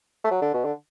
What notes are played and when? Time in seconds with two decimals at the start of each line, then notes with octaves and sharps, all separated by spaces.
0.24 A3
0.31 F#3
0.42 D3
0.54 B2
0.65 D3